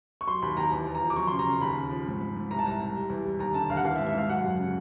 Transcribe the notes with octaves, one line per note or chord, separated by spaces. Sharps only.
C#6
F#3 C6
D#2 B5
D#2 A#5
E2 A#5
E2
A#5
F3
D6
F#3 C#6
C6
C#3
A#5
C#3
D#2 B5
C#3
F3
G#2
G#2
G#2
C2 A#5
A5
C2 A#5
C2
G3
E2
G3
D#2 A#5
D3 A5
D#2 F5
F#5
E3 F5
E5
G#2
E5
G#2 F5
F#3 F#5
F#2
C#3